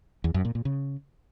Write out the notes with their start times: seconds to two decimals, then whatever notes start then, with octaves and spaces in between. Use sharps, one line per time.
0.24 E2
0.34 F#2
0.45 A#2
0.55 A#2
0.65 C#3